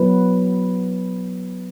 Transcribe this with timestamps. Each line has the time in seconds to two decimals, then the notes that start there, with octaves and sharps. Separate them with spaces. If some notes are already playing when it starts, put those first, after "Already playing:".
Already playing: F#3 B3 E4 B4